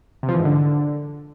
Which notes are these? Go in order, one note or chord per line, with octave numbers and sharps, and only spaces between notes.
C3
F3
E3
G#2
D3